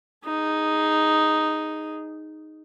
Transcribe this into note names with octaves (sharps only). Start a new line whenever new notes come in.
D#4 G#4